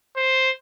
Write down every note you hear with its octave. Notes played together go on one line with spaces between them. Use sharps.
C5